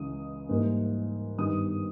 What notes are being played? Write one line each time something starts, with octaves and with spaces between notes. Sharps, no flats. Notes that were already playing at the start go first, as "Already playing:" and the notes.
Already playing: C#2 C#3 E3 G#3 D#6
G#2 E3 G3 A#3
G2 D#3 G3 B3 D#4 D#6